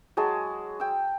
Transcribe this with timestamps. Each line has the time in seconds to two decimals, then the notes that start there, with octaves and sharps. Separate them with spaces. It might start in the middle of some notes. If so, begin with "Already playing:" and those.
0.17 F#3 G#3 G#4 A5
0.80 G5 E6